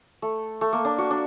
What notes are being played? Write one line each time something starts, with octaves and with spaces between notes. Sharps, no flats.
A3
A3
A#3
D4
F#4
D4